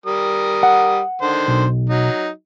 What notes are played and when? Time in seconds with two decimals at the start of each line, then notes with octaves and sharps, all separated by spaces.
0.06 G3 A#4 D#6
0.63 F#5
1.22 D3 D#3 C5
1.48 B1
1.89 F#3 D#4